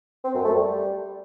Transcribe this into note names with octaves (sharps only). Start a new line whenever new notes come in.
C4
F#2
A3
G3